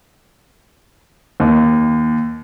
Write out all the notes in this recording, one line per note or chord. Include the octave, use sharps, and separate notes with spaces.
D#2